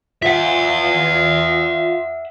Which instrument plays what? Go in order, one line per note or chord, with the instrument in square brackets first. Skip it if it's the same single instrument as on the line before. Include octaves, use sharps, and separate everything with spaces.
[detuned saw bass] F4 [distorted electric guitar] E5 F#5